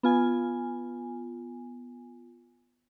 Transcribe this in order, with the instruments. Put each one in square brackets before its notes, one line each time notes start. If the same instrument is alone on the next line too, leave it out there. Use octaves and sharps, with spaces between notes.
[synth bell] B3 F4 G#5